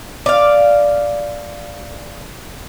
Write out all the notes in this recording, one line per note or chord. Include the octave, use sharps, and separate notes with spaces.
D5 F5